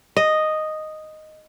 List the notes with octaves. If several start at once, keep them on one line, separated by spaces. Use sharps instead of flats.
D#5